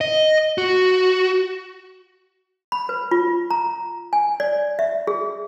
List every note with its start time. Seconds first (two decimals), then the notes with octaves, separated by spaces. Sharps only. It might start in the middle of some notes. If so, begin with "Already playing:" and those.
0.01 D#5
0.58 F#4
2.72 B5
2.89 B4
3.11 F4
3.51 A#5
4.13 G#5
4.40 D5
4.79 E5
5.07 G#4